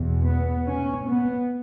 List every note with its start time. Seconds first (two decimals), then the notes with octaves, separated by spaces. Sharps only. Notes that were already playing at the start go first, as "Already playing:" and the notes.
Already playing: E2 B2
0.24 B3
0.65 C#4
1.05 B3